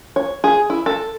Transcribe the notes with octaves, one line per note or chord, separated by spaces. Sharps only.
C#5
G#4
E4
A4